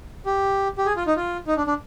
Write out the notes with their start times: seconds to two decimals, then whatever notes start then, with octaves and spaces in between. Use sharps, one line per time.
0.26 G4
0.78 G4
0.86 G#4
0.96 F4
1.07 D#4
1.16 F4
1.47 D#4
1.57 D4
1.67 D4